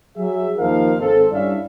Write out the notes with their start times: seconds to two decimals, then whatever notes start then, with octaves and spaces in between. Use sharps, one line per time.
0.17 F#3 G#4 E5
0.58 D#2 F3 D#4 A#4 F5
0.99 G#1 G#2 C4 A4
1.32 G2 C#4 E4 D5 E5 F5